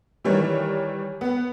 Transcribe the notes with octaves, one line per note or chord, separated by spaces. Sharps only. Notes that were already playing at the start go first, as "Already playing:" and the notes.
D#3 E3 G3 C#5
B3